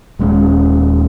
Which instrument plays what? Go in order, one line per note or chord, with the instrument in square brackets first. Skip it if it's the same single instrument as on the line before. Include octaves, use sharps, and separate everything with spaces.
[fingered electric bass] D#1 G#3 C#4